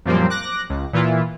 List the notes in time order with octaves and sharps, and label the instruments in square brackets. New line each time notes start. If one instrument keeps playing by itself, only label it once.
[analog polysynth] F#2 A#2 F3 G3 A#3 C4
D6 F#6 A#6
C#2
A#2 E3 E4 F4